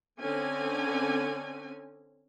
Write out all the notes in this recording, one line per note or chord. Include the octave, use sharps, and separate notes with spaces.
D3 C4 C#4 G#5